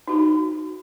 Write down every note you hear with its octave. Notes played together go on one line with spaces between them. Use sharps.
D#4 F#4 B5